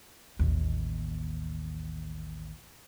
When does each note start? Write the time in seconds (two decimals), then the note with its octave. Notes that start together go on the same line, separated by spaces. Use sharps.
0.39 A1 D#2